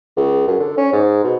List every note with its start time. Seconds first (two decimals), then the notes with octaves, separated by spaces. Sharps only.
0.17 C#2
0.48 F#2
0.60 D3
0.77 C#4
0.92 G#2
1.24 B2